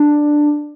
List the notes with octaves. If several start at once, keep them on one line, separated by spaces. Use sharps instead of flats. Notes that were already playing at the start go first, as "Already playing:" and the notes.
Already playing: D4